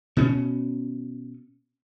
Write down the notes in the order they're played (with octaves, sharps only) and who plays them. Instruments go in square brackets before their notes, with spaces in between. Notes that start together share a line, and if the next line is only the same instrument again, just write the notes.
[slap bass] B2 C#4